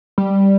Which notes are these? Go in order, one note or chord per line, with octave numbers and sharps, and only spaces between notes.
G3